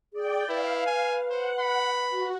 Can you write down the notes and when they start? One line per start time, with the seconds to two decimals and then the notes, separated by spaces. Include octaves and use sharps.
0.13 G#4 D5 G5
0.49 E4 B4 F5
0.86 G#5
1.30 C5 F#5
1.59 B5
2.09 F#4